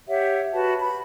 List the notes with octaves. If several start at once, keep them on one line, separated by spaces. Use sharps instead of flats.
G4 C#5 E5 F#5
F#4 B4 A5
B5